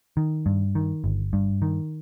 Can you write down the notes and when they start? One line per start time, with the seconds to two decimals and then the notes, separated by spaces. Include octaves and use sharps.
0.17 D#3
0.46 G2
0.75 D#3
1.04 G1
1.33 G2
1.62 D#3